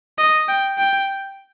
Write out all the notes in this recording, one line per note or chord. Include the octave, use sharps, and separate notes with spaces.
D#5
G5
G5